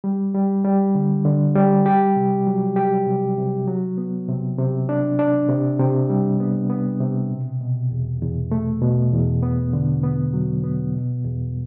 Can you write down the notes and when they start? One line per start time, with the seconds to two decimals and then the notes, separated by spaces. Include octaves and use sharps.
0.04 G3
0.35 G3
0.65 G3
0.95 D3
1.25 D3
1.55 G3
1.86 G4
2.16 C3
2.47 F#3
2.76 G4
3.06 C3
3.37 C3
3.68 F#3
3.98 B3
4.28 C3
4.59 C3
4.89 D4
5.19 D4
5.49 C3
5.79 C3
6.10 G3
6.40 B3
6.70 B3
7.01 C3
7.31 B2
7.61 B2
7.92 E2
8.22 E2
8.51 A3
8.82 B2
9.13 E2
9.43 B3
9.73 D3
10.03 B3
10.34 F#3
10.64 B3
10.94 B2
11.24 E2